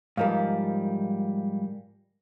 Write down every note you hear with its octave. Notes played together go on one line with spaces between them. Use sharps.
G#2 F3 G3 A#4 D#5 F5